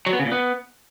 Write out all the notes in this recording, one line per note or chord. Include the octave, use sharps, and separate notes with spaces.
F#3
B3
C#3
A#2
B3